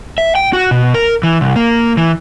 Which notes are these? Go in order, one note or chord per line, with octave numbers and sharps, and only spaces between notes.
E5
G5
F#4
B2
A#4
E3
C2
A#3
E3